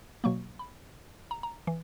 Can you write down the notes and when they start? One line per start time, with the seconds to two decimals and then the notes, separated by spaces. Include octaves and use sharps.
0.24 B2 F#3 A#3 C#6
0.59 B5
1.31 A#5
1.43 A#5
1.67 E3